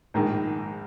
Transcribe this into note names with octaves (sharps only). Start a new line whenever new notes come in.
A#1 G#2 D#3